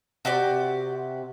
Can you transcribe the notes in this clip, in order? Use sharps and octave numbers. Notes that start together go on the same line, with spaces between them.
C3 F#4 G4 D5